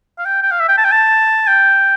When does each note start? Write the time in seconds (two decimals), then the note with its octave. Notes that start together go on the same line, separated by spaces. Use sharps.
0.18 F5
0.25 G5
0.43 G5
0.51 F5
0.60 E5
0.68 G5
0.78 A5
0.84 G5
0.92 A5
1.47 G5